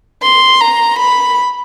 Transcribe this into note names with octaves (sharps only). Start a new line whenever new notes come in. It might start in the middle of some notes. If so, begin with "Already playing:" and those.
C6
A#5
B5